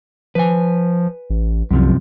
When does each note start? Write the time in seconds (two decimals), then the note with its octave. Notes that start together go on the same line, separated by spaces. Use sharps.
0.35 F3 B4 G#5
1.30 A1
1.71 C2 F#2 C3 F3